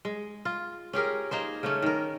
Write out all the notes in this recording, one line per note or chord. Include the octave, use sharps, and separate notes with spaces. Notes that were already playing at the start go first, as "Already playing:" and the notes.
G#3
F4
C#4 G4 G#4 A#4
A#3 D#4 G#4 C5
C#3 A3 C#4
D#3 A#4